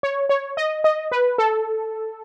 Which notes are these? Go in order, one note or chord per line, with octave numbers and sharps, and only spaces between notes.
C#5
C#5
D#5
D#5
B4
A4